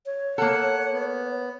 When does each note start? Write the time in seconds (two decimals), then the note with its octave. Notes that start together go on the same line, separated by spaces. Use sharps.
0.06 C#5
0.38 A#3 A4 F#5
0.92 B3